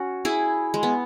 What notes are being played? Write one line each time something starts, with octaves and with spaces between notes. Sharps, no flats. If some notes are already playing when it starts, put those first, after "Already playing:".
Already playing: C#4 F#4
E4 G#4
G#3
B3